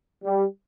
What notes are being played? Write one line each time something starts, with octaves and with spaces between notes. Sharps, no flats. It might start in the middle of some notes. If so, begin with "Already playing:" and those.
G3